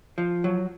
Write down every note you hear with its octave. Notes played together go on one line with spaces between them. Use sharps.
F3
F#3